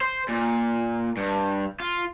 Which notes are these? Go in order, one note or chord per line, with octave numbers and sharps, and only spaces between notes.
C5
A#2
G2
F4